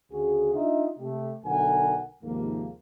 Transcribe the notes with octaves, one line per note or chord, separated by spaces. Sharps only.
D2 C#3 F#4 G#4
D4 D#4 F4 D#5 E5
C3 A3 G4
B1 D3 A#4 F#5 G#5
D#2 G#2 C3 F3 A#3